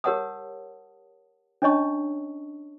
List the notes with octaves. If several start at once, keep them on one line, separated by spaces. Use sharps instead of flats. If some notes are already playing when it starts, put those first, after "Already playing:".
G4 A#4 C#5 F#5 A5 D#6
C#4 D4 C#5 D#5 A5 C#6